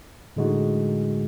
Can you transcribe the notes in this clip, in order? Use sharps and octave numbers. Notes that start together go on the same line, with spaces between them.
A2 D3 G#3 D#4 F#4